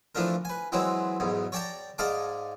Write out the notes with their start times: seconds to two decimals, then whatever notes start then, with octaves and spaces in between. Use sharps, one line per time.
0.15 E3 F3 A3 D4 A#4
0.45 B4 G#5
0.72 E3 F#3 G#3 C4 E4
1.20 B1 E2 G#2
1.52 C#5 D5 G5 A5 A#5
1.98 G#2 D#4 D5 F5 A5 D6